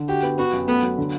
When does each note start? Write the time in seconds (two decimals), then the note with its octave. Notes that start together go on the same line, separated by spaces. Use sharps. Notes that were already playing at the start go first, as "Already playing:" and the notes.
Already playing: D3
0.08 F#4 G4
0.23 B3
0.38 B3 F#4
0.53 F#2
0.68 A3 B3
0.83 F#3
0.98 D3